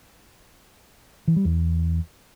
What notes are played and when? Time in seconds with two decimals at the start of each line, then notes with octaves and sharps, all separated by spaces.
1.28 E3
1.36 G3
1.45 E2